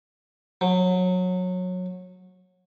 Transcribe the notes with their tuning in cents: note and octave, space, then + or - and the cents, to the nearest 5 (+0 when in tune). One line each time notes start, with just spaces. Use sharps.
F#3 -20